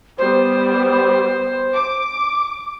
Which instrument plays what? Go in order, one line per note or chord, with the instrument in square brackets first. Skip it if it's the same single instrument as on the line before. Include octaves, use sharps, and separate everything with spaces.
[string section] G3 B3 [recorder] C5
[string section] D6